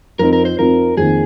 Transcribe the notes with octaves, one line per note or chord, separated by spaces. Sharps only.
F2 F3 C4 D#4 A#4
A#4
C5
F2 F3 C4 D#4 A#4
F2 D#3 A#3 G#4